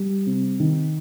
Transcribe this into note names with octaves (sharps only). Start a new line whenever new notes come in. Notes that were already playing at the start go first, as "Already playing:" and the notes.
Already playing: G3
C3
D#3